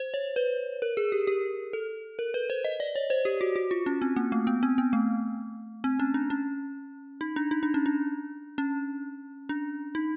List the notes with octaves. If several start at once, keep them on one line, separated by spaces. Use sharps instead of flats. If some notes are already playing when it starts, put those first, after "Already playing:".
Already playing: C5
C#5
B4
A#4
G#4
G4
G4
A4
A#4
B4
C5
D#5
D5
C#5
C5
G4
F#4
F#4
F4
C#4
C4
A#3
A3
B3
C4
B3
A3
C4
C#4
D4
C#4
D#4
D4
D#4
D4
C#4
D4
C#4
D4
D#4